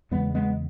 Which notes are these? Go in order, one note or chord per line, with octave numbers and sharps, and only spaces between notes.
E2 C#3 G#3 B3
G#3 B3